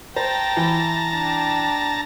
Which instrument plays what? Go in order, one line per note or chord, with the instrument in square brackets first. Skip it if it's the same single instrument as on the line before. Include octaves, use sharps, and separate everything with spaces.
[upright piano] C5 [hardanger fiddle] G5 [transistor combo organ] A5 A#5
[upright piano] E3
[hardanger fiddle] D4 G5